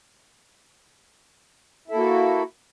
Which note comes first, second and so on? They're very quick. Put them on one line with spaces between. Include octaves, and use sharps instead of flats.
E4 A4 A#3 F#4